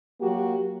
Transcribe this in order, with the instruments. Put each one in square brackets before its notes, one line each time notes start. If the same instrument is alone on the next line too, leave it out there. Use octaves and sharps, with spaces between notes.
[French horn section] F#3 A#3 F#4 G4